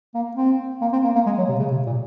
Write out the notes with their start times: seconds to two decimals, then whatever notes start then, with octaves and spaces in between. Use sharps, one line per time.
0.14 A#3
0.37 C4
0.81 A#3
0.93 C4
1.04 A#3
1.15 A#3
1.27 G#3
1.38 F#3
1.49 C3
1.59 C#3
1.71 C3
1.86 A#2